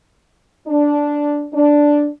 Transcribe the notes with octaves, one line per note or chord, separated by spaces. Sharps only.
D4
D4